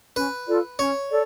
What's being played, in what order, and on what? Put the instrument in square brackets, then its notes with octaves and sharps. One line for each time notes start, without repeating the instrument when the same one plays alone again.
[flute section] C#4 [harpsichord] B4
[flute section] F4 A4 D5
[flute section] C#4 [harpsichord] C#5
[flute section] A4 D5